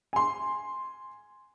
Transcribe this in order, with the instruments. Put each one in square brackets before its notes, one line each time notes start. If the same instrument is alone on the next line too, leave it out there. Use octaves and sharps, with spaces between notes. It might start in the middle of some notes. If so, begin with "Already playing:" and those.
[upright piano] G#5 C6